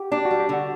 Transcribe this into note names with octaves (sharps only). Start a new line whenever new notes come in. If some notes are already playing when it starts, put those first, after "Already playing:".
Already playing: F#4 G4
D4 G4
F#4
G3
G4
D3 F#4